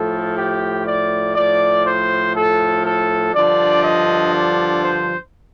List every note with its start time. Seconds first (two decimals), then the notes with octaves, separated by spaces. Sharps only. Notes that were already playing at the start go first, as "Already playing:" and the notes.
Already playing: A2 F3 A4
0.36 G4
0.86 D5
1.35 A2 F3 D5
1.85 C5
2.35 A4
2.84 A4
3.33 G2 D3 F3 D5
3.83 D#5
4.33 D5
4.83 C5